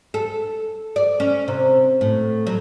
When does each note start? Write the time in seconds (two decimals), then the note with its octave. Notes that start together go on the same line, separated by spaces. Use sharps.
0.14 A4
0.96 D5
1.20 C#4
1.48 C3
2.01 A2
2.47 F#3